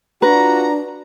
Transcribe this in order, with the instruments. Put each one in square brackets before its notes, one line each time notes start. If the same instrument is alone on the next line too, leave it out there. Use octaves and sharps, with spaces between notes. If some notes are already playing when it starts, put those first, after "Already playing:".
[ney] D4 [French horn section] F4 F#4 [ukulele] B4 [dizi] A#5